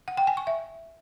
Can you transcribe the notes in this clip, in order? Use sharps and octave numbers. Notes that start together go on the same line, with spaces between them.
F#5
G5
G#5
C#6
E5